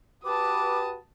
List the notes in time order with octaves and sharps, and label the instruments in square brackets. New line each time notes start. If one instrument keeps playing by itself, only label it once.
[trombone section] F#4 G4 B4 [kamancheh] A5 D#6 [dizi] D6